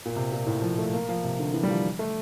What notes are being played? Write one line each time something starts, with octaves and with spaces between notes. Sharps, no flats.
A#2
C3
A#2
A2
F3
A3
A#3
F3
C3
D3
E3
G3
F3
A3